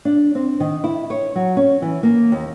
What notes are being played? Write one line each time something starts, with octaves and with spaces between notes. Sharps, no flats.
D4
C4
D#3
E4
C#5
F#3
C#4
E3
A#3
D#2